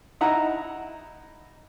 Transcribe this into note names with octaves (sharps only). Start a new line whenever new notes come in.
D#4 E4 F#5 A#5